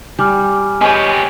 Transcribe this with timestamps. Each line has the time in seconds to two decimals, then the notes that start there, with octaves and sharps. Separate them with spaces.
0.19 G3 G#5 D6 F6
0.81 G#3 B3 G4 C#5